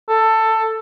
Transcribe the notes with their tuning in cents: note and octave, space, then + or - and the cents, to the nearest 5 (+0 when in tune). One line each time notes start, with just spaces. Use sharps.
A4 +15